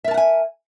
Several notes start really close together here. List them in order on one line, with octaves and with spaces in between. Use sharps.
E5 A#4 A5 F#5 G#5